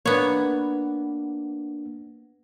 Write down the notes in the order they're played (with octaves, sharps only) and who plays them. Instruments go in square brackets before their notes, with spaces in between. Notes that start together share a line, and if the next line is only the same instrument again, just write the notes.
[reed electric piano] A#3 D4 [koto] B3 C#5